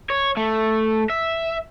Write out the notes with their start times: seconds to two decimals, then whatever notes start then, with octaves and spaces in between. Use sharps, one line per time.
0.10 C#5
0.37 A3
1.10 E5